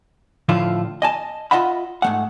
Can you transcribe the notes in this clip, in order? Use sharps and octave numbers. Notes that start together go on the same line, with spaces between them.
A2 D3 F3 A3 E4 F4
D#5 G#5 A5
F4 D#5 E5 F#5 B5
G#2 A3 F#5